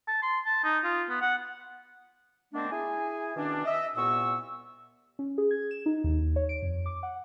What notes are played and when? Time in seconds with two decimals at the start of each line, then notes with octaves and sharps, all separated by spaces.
0.08 A5
0.22 C6
0.46 A5
0.64 D#4
0.84 F4
1.09 B3
1.21 F#5
2.54 D#3 A3 B3 C4 D4
2.71 E4 G#4 G#5
3.36 B2 D#3 C#4 D4
3.65 D#5 E5
3.96 C2 A#2 B3 C#6 E6
5.19 C#4
5.38 G#4
5.51 G#6
5.71 E7
5.86 D#4
6.04 D#2
6.36 C#5
6.49 D7
6.63 F2
6.86 D6
7.03 F#5